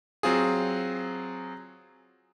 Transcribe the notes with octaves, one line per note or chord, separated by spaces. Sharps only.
F#3 C4 F4 G#4